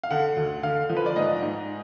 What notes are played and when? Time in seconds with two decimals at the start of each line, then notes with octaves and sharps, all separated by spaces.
0.03 F5
0.11 D3 F#5
0.36 D2
0.63 D3 F5
0.90 F3
0.97 B4
1.06 D5
1.16 G#2 D#5
1.42 G#2